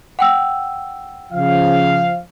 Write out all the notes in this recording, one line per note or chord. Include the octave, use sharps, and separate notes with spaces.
F#5 G5 E6
C#3 F3 F5